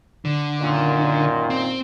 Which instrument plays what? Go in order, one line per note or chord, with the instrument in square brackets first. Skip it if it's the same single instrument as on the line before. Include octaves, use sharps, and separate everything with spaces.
[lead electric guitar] D3
[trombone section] F#2 A#2 D#3
[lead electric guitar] C4